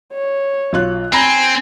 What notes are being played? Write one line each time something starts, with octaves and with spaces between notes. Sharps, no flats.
C#5
B1 F4 F#6
C4 G#5 A#5 B5 A#6